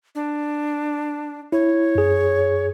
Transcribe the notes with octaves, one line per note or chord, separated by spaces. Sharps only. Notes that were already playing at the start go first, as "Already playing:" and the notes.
D4
E4 C#5
F#2 G#4